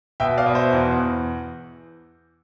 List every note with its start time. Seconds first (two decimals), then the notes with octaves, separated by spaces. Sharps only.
0.20 B2 E5 G5
0.38 D5 F5
0.46 B2
0.55 C5 E5
0.73 E2
0.99 E2